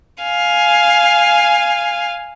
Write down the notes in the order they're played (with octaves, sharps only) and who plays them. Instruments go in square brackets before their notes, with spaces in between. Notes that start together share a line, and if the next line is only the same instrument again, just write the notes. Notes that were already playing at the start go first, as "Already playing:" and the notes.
[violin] F5 G#5